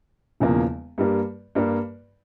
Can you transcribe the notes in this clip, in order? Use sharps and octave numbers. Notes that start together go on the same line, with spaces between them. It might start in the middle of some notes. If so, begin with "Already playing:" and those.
E1 E2 C#3 F3 A#3
G2 G3 A#3
G2 G3 A#3